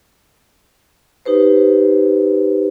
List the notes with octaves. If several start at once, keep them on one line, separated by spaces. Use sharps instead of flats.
D#4 G4 B4 C5